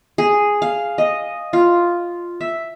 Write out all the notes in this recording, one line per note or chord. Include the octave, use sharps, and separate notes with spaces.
G#4
F5
D#5
F4
E5